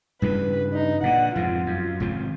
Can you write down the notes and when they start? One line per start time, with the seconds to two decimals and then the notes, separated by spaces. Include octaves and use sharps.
0.22 G2 C#3 E3 B4
0.74 D#4
1.03 A#2 D3 F#5
1.36 F2 G#2 C3 F4
1.66 F#2
2.00 G#1 C3 F3